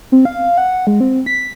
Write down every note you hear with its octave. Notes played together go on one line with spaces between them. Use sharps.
C4
F5
F#5
G#3
C4
B6